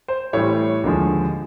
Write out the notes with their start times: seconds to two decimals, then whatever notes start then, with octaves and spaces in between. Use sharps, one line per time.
0.08 C5
0.33 A2 E3 G3 C#5
0.83 D#2 D3 F3 G#3